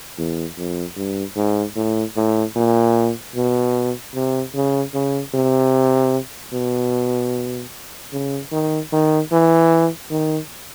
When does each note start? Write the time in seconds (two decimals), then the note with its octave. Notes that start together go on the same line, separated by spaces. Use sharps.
0.18 E2
0.57 F2
0.96 G2
1.36 G#2
1.76 A2
2.16 A2
2.56 A#2
3.36 B2
4.15 C3
4.55 C#3
4.94 C#3
5.34 C3
6.53 B2
8.13 C#3
8.52 D#3
8.92 D#3
9.32 E3
10.10 D#3